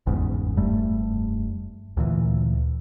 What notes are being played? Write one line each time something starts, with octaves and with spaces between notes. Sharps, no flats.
G1 E2 G#2 C#3
F1 G2 G3 A3
D2 A#2 E3